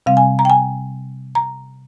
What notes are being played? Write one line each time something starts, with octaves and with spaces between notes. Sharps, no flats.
C3 G3 C4 F5
G#5
A#5
G5
G#5
A#5